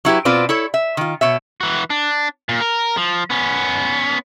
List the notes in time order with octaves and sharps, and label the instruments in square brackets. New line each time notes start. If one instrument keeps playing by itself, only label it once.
[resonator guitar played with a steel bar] F#3 E4 G4 B4
B2 C4 F4 B4 D5
E4 A4 C#5
E5
D#3 F4
B2 C#5 E5
[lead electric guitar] E3 F#4
D4
A#2
A#4
F3
B3 C#4